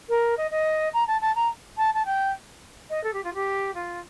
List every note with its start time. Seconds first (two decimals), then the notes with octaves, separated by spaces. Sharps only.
0.09 A#4
0.37 D#5
0.51 D#5
0.93 A#5
1.07 A5
1.21 A5
1.35 A#5
1.77 A5
1.94 A5
2.06 G5
2.90 D#5
3.03 A4
3.13 G4
3.24 F4
3.34 G4
3.74 F4